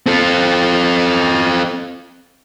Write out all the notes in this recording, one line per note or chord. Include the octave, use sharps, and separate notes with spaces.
C4 A4